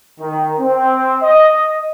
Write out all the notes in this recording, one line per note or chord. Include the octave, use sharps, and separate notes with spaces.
D#3
C4
D#5